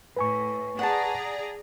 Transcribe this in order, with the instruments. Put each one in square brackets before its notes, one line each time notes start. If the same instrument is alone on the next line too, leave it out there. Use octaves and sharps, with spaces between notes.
[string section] A2 [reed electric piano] B4 G#5 C#6
[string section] G#4 D5 A#5 [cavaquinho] F#5 A5